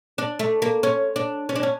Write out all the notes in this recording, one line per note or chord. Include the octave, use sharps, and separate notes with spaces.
D4
A3
A#3
C#4
D4
C#4
D4
C#4